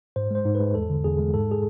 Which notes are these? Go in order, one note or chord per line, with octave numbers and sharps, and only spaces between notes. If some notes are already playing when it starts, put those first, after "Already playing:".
G#2 C5
G#3 C5
G#2
B4
G#3
E2 A4
D3
E2 G#4
G#3
G#2 A4
G#4